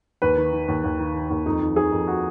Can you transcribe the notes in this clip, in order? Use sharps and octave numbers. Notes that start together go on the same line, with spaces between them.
D#2 B4
D#3
D#3
D#2
D#2
D#3
D#3
D#2
F2 D#4
D#3
D#3 G#4
F2
F#4